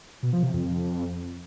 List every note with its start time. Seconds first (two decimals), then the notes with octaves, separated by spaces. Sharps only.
0.23 B2
0.33 F3
0.43 C3
0.53 F2